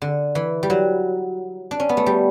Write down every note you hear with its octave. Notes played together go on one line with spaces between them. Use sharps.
D3
E3
G3
F#3
D4
C#4
B3
A3
G3